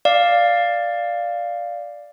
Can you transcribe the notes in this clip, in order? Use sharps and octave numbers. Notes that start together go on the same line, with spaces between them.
D5 F5